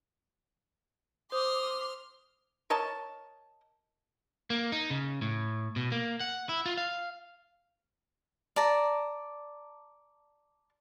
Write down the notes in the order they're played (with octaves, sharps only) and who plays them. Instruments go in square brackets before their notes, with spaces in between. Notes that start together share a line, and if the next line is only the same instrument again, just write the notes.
[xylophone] C5 [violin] C6 F6 [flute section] D6 [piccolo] D#6
[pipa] A#4 C#5 D#5 A5
[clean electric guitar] A#3
D#4
C#3
A2
B2
A#3
F#5
E4
F4
F5
[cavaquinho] D5 A5 A#5